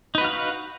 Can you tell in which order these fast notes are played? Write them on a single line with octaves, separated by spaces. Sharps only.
D#4 B4 F#4 F5 F#5